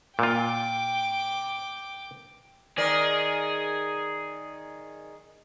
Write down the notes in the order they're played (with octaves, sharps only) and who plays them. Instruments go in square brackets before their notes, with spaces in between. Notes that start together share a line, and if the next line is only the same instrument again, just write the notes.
[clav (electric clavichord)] A#2 F4 [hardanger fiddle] G5 D6
[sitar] D#3 A#4 D5 [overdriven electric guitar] G#4